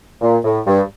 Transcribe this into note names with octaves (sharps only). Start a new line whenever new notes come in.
A#2
A2
G2